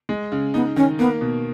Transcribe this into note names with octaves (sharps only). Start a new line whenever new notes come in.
G#3
C#3
B3 D#4
D#3 C#4
A#3 B3
B2